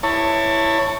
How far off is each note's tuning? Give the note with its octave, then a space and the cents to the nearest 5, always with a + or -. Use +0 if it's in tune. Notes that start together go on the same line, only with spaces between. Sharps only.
E4 +0 C#5 +0 A5 +25